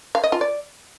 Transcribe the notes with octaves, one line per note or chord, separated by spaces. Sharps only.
F5
D#5
F4
D5